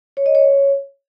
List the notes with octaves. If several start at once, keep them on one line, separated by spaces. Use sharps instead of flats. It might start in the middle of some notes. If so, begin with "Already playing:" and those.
C#5
D#5
C#5